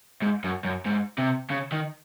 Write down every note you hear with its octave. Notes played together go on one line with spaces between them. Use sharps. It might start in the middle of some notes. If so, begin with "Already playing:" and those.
G#2
F#2
F#2
G#2
C3
C#3
D#3